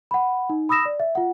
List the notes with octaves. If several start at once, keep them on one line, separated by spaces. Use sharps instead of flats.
F#5 B5
D#4
B5 D#6 E6 A#6 E7
D5
E5
F4 F#5